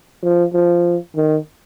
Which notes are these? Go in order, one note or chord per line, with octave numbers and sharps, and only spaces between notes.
F3
F3
D#3